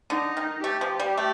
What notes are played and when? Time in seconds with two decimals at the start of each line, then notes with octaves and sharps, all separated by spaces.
0.10 D3 D#4
0.37 D#3
0.63 A3 G4
0.81 F3
1.00 G3
1.18 A3